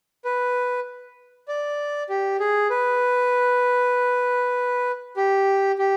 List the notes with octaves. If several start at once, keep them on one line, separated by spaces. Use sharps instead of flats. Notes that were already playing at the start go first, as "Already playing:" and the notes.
B4
D5
G4
G#4
B4
G4
G4